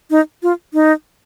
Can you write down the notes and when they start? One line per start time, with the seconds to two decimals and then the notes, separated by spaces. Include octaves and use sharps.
0.11 D#4
0.43 F4
0.74 D#4